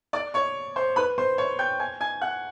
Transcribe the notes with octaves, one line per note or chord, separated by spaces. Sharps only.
D5 D6
C#5 C#6
C5 C6
B4 B5
C5 C6
C#5 C#6
G5 G6
G#5 G#6
G#5 G#6
F#5 F#6